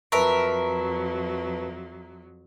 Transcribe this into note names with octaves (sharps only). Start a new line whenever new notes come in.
F2 F#3 A#4 B4 E5 A5 C#6